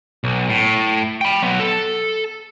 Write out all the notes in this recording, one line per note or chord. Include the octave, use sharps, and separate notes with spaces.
B1
A2
G5 B5
F#3 B3
A4